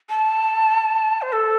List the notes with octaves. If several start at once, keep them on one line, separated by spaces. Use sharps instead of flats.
A5
C5
A4